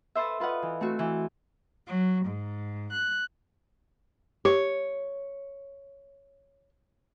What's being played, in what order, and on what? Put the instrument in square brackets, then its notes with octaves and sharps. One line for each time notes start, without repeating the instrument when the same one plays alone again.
[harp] A4 B4 C5 E5
F4 B4 D#5 F#5
E3
A3 C4 F#4
E3
[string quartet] F#3
G#2
F#6
[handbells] G4 [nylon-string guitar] C#5